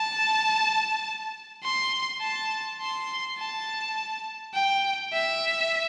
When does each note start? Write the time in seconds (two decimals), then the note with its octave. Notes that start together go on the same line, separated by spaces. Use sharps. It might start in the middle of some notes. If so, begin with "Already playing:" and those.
Already playing: A5
1.63 C6
2.21 A5
2.81 C6
3.38 A5
4.54 G5
5.13 E5